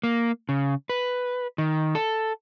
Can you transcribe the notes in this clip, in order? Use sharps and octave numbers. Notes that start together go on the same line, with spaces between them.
A#3
C#3
B4
D#3
A4